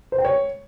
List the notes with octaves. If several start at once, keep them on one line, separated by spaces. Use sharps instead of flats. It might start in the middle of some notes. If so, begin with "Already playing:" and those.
C5
G5
C#5